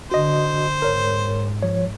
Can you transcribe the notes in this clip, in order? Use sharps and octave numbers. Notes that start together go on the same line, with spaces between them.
D3 F#4 C5 D#5
G#2 A#4 C#5
F3 C#5